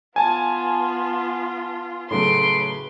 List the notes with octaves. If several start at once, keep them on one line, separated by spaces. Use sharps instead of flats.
B3 F4 G#5 A5
A2 C#3 F#3 B4 C6 D7